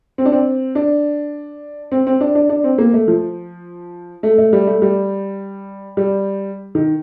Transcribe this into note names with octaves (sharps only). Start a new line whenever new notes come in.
C4
D4
C4
D4
C4
C4
D4
D4
D4
C4
A#3
A3
F3
A3
A3
G3
A3
G3
G3
D#3